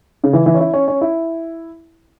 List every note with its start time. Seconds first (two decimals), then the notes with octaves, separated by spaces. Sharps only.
0.24 C#3
0.33 E3
0.46 E3
0.54 C#4
0.60 E4
0.73 C#4
0.88 C#4
1.01 E4